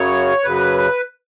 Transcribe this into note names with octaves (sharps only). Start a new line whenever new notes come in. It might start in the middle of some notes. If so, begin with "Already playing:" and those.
Already playing: F#2 C#3 F#3 C#5
F#2 C#3 F#3 B4